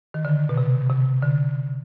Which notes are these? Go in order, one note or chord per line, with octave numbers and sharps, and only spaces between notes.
D#3
D3
B2
C3
C3
D3